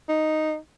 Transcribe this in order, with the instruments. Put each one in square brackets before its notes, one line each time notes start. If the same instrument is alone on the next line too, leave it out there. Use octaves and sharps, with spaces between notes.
[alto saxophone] D#4